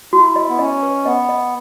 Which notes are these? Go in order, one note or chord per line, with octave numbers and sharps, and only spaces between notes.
E4 F#4
D#5
B3
C#4 D#5
B4
B3 D#5
D#5